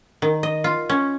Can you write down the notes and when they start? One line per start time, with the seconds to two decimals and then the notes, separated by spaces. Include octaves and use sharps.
0.22 D#3
0.43 D#5
0.64 F4
0.89 C#4